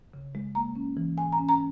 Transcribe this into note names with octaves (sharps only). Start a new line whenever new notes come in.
C#3
G#3
A#3 A#5
C#4
E3
G#2 G#5
A#5
C#4
A#5